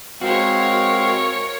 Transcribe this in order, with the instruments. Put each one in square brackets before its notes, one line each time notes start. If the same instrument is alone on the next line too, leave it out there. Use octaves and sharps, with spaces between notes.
[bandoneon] G#3 C4 F5 [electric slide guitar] F#4 [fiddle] A#4 C#5